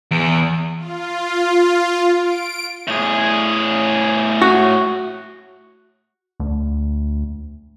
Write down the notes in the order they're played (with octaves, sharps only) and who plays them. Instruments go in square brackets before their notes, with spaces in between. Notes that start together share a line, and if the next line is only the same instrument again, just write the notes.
[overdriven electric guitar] E2
[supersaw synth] F4
D7
[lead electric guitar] A2 G#4
[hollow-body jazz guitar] F#4
[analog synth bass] D2